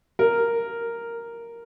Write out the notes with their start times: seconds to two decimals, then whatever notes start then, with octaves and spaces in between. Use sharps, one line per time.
0.19 A#4